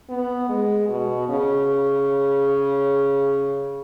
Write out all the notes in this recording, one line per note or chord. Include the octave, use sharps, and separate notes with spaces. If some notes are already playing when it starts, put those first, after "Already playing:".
B3
G#3
B2
C#3